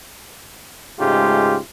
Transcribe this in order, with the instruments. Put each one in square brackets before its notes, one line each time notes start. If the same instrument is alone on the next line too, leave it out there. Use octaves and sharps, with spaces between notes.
[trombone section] G#2 C#3 G#3 A3 F4 G4